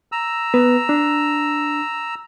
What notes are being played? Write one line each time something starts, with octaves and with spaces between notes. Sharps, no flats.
A#5 E6
B3 B4
D4